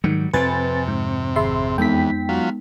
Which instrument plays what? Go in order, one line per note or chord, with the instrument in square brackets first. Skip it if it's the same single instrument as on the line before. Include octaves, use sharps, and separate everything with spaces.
[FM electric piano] G#2 D#3 [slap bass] F#3 G3 [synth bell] C#7
[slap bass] F2 C4 [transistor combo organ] C3 [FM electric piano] B4 G#5 A6
[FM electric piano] G#2
[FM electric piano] G#1 E5 C6 [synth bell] G#4 B5
[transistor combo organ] E2 [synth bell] G#3 B3 D#4 [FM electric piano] G5 B6
[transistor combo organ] F#3 F4